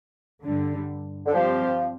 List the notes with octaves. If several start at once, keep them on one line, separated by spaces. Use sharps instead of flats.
G2 D3 G3
D3
F3 G3 C4 G4 C5 F5